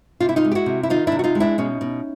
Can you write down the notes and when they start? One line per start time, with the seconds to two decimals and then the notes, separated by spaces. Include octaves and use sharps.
0.20 C3 F4
0.29 E4
0.36 D#4 F4
0.45 G#3
0.51 G4
0.55 E4 F#4
0.66 C3
0.83 E4
0.90 D#3 D#4 F4
1.07 C3 D4 E4
1.19 F#4
1.24 D#4 F4
1.35 G#3
1.40 D4 E4
1.58 B2 C#4 D#4
1.81 B2